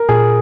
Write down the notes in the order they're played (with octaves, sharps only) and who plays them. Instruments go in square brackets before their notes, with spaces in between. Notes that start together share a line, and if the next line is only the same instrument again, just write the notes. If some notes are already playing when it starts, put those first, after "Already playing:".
Already playing: [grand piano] A#4
[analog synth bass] A#2 [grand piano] G#4